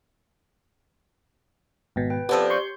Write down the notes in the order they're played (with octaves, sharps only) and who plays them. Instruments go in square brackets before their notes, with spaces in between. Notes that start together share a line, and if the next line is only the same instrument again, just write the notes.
[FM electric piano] G#1 B2
[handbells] B4 G5
[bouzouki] F3 C4 D4 [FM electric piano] B3 A4 [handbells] G4 C#5
[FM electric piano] C6 C#6 G6